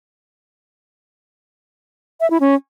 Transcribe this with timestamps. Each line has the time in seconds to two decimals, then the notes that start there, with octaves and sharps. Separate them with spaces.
2.21 E5
2.30 E4
2.40 C#4